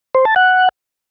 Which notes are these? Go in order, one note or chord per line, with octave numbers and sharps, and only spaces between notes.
C5
A5
F#5